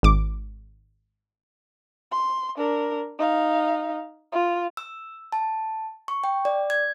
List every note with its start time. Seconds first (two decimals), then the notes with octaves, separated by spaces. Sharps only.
0.03 G#1 D6
2.12 C6
2.57 D4 A#4
3.19 D#4 F5
4.32 F4
4.77 E6
5.32 A5
6.08 C#6
6.24 G5
6.45 D5
6.70 G#6